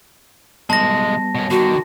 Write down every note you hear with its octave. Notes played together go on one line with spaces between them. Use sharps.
B1 G3 G#3 B3 A5 A#6
B2 C#4
D3 D#3 F#4